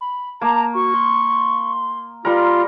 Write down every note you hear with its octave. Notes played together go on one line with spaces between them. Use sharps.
B5
A#3 A5 A#5
F#4 C#6
C6
G3 F4 A#4 C6